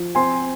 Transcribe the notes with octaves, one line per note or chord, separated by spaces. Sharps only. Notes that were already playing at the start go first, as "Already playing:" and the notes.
Already playing: F3
C4 G#5 C6